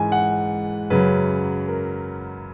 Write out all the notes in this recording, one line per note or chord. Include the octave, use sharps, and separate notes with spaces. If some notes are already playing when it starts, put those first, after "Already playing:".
Already playing: G#2 E3 G#5
F#5
F#2 C#3 F#3 B4
A#4